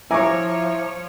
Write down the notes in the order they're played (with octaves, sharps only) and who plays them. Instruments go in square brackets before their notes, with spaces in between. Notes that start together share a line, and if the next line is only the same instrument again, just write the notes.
[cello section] F3 C#5 [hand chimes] E4 [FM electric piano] E5 A#5 D6 [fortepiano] G#5 C#6